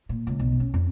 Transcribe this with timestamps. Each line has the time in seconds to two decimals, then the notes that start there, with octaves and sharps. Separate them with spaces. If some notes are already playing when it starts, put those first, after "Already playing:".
0.09 A#2
0.27 C#2
0.39 B1
0.60 C#4
0.74 F2